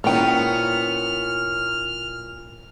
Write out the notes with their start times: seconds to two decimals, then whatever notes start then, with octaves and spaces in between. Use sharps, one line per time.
0.04 A#2 F3 B3 C#4 D#4 E4 G5 F6